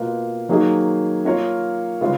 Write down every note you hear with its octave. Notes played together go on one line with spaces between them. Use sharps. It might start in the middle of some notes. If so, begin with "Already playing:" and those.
Already playing: B2 A#3 F4 B4
D#3 F#3 A#3 D#4 G#4
A#3 F4 A#4 C#5
C#3 G#3 C#4 F4 B4